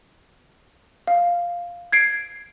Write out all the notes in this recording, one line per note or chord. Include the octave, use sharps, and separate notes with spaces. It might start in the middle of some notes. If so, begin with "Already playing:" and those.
F5
G#6 C7 D7